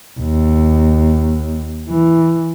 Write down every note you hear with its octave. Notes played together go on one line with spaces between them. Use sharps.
D#2
E3